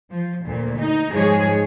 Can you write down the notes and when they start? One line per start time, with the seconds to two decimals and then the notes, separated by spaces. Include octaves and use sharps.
0.11 F3
0.46 D2 A#2
0.79 D#4
1.12 G#2 F3 G#3 G#4 C#5